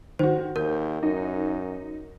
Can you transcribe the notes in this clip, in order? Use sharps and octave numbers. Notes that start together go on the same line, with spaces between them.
G1 D#3 F#4 C5
D#2 A#4 G6
F#2 D#4